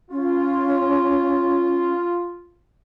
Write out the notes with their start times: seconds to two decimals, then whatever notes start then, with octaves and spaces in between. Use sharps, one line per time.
0.11 C#4 F4